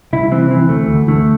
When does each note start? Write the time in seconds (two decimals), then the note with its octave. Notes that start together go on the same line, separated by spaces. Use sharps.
0.13 C2 E4
0.31 E3 C4
0.51 E3 C4
0.69 D2 A3
0.89 D2
1.08 D3 A3